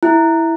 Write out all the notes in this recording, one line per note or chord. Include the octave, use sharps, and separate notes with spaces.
E4